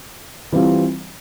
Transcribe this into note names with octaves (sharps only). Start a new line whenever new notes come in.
E3 G3 C4 F4